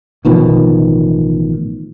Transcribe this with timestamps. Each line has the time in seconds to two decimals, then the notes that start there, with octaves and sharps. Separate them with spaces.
0.25 A1 B2 D#3 F3